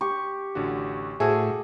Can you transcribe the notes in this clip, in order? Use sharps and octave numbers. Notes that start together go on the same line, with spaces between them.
G4 C#6
A1 D3 F#4
A2 F#4 G#4 A4 C5 E5